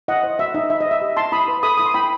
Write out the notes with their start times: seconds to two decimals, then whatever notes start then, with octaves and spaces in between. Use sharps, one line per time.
0.08 E4 D#5 F#5
0.23 C5
0.39 F#4 E5
0.54 D#4 D#5
0.70 D#4 E5
0.81 D#5
0.86 C5
0.91 E5
1.01 G4
1.17 E4 A5 C6
1.32 E4 B5 D#6
1.48 B4
1.63 A4 B5 D#6
1.78 E4 D#6
1.86 C6
1.94 E4 G5 B5